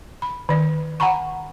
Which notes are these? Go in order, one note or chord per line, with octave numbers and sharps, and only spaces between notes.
B5
D#3 D5
F#5 G#5 A#5 B5 C#6